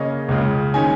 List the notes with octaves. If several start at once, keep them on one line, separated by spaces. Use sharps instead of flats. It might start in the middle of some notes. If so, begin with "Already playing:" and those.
Already playing: C#3 A#3 C#4 D#5
C#2 C#3 G#3
D#3 G#3 C#4 G#5